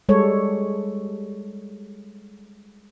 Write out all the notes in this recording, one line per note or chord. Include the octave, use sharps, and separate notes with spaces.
G3 G#3 A4 C#5